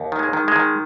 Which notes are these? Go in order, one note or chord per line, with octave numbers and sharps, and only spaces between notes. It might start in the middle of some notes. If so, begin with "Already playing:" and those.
Already playing: D#2
D#3
G#3
D#3
G#3
D#3